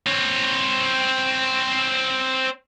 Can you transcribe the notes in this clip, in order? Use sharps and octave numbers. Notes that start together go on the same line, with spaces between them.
C4 C#5